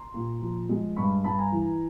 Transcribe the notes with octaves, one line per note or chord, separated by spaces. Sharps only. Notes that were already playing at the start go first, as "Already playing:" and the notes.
Already playing: A#5 C6
A#2
F3
G#3
G2 B5 C#6
G2 A5 B5
G#5 A#5
E3